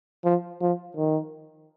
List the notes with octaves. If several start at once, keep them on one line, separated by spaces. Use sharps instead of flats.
F3
F3
D#3